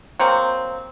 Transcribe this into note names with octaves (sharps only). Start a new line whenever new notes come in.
F#3 A#3 C4